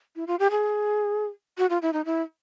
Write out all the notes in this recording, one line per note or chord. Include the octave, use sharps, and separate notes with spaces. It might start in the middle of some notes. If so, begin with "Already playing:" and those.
E4
F4
G4
G#4
F#4
F4
E4
D#4
E4